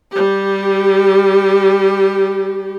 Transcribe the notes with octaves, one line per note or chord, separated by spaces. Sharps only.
G3 G4